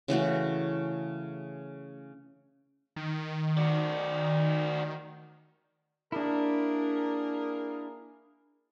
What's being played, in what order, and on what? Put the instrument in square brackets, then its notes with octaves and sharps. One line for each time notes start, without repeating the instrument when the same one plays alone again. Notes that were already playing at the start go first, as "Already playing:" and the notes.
[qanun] C#3 E3 A3 F#4
[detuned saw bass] D#3
[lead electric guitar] F#4 D5
[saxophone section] A#3 G#4 A#4 [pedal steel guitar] D4 E4